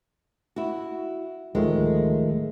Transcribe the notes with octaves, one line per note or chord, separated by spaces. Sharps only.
E4 F#4
D1 D#3 F3 G#3 A3